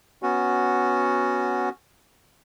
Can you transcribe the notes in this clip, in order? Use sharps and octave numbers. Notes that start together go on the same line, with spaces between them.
B3 C#4 F#4